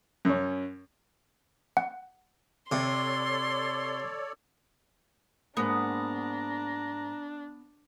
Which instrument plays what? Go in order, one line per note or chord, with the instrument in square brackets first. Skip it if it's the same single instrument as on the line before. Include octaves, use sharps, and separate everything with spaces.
[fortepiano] F#2 C#4
[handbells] F#5
[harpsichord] C3 [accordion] A4 C#5 D5 [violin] C6
[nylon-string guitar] G#2 A#3 [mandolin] B3 [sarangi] D4 [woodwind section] A#5